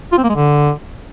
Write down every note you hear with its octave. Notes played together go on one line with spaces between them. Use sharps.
F4
C4
A#3
G#3
D3